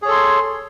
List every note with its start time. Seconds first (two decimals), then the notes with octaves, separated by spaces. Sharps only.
0.02 G#4
0.05 C#5
0.08 A4
0.11 C6